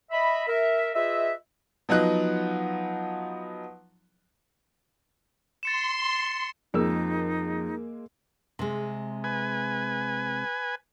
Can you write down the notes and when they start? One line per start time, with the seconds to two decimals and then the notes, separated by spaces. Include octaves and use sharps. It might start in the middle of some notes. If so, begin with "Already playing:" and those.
0.11 D#5 E5 B5
0.47 A#4 E5
0.94 F4 G#4 B4 D#5 E5
1.89 F3 F#3 B3 D#4 F#6
5.63 C6 A6 C#7 E7
6.74 F2 G#3 A#3 D#4 E6
8.59 C3 G#3
9.24 B4 G#5